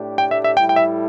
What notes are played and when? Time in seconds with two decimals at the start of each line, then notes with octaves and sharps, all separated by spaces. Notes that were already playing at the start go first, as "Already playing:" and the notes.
Already playing: A2 A3 D4 G4
0.18 G5
0.31 E5
0.44 E5
0.57 A2 G3 E4 A4 G5
0.69 G5
0.76 E5